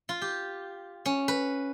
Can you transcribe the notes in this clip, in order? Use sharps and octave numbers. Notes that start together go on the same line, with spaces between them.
F4
G4
C#4
B4